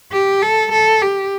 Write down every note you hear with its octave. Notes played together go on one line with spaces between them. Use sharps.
G4
A4
A4
G4